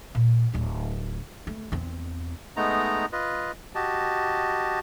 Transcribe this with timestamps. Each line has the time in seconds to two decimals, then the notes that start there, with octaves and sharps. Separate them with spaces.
0.15 A#2
0.54 D1 A3
1.47 A3
1.72 E2 C4
2.57 G#3 A3 B3 D#4 A#5
3.12 F4 B4 D#5
3.75 F#4 G4 D#5 A5